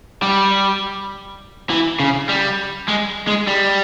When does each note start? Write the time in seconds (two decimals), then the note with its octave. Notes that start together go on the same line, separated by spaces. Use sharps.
0.22 G3
1.70 E3
2.00 C#3
2.29 G3
2.89 G#3
3.27 G#3
3.47 G3